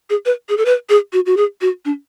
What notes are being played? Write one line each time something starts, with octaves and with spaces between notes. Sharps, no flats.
G#4
B4
G#4
A4
B4
G#4
F#4
F#4
G#4
F#4
D4